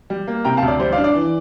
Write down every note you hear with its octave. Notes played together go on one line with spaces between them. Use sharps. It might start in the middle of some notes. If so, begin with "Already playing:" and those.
G3
A#3
C3 G5 A#5
F5 A5
D2
D5
G3 C5
D5 F5
D4
D5
E3